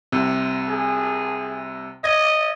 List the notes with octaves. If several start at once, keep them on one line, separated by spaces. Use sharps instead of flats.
C2 C3
G#4
D#5 G#6 A#6